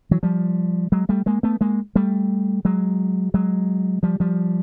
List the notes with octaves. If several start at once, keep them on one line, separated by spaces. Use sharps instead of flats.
E3 F#3
F3 G3
F#3 G#3
G3 A3
G#3 A#3
A3 B3
G#3 A#3
G3 A3
F#3 G#3
F#3 G#3
F3 G3
F3 G3